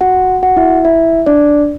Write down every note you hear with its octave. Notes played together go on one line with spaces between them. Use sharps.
F#4 F#5
F#4 F#5
E4 E5
E4 E5
D4 D5